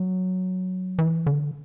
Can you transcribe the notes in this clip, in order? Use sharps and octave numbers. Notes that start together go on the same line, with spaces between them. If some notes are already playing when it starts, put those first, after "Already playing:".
Already playing: F#3
E3
D3